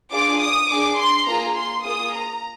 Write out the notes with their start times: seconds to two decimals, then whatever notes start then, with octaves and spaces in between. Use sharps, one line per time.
0.12 D4 F4 G#4 D6
0.40 D#6
0.69 D4 G#4 D6
0.98 C6
1.27 A#3 F4 G#4 A#5
1.55 C6
1.84 A#3 F4 G#4 D#6
2.13 A#5